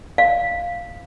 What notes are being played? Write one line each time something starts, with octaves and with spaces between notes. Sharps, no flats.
F5